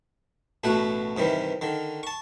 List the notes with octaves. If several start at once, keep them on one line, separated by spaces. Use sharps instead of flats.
A1 B2 A3 F#4 F#5
G2 C3 D#3 E3
D3 D#3
A5 C#6